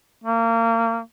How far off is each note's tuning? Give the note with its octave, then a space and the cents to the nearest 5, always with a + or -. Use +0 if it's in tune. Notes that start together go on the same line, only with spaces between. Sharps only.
A#3 -30